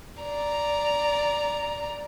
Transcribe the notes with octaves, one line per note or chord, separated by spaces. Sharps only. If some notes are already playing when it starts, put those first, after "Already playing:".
D5 A#5